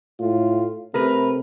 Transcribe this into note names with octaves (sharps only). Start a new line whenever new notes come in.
A2 F4
C3 A3 A#4 B4